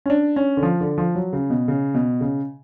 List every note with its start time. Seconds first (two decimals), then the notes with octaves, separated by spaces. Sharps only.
0.06 C#4
0.10 D4
0.36 C#4
0.57 D3
0.63 F3
0.80 D3
0.98 F3
1.15 F#3
1.33 C#3
1.50 B2
1.68 C#3
1.94 B2
2.21 C#3